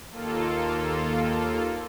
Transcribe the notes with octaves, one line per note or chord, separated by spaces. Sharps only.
D#2 A#3 F4 A4